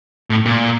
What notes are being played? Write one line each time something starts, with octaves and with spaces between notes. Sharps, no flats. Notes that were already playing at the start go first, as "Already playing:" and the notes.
A2
A#2